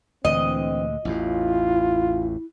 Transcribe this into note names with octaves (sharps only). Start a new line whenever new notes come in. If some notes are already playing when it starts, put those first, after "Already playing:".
D2 A#2 D3 E3 C4 D#5
A1 E2 A2 E4 F4